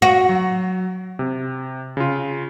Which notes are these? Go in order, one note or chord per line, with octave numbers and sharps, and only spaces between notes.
F#4 A#6
F#3
C3
C#3 F4